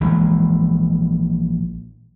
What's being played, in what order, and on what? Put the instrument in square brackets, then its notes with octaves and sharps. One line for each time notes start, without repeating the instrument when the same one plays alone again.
[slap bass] A#1 E3 G#3